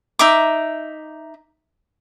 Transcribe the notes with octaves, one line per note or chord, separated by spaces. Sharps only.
D#4 E5 D6